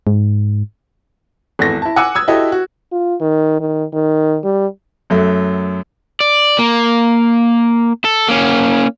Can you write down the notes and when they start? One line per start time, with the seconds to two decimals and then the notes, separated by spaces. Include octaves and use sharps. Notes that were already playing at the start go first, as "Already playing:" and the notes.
0.07 G#2
1.59 G#1 E2 A4 A#6
1.82 E4 A5
1.96 F#5 G#5 D6 E6 F#6
2.15 D#6 E6 G#6
2.28 E4 F#4 G4 A4 D#5
2.52 F#4
2.92 F4
3.21 D#3
3.60 D#3
3.93 D#3
4.44 G3
5.10 F#2 F#3 A3
6.20 D5
6.59 A#3
8.05 A4
8.29 A#3 C#4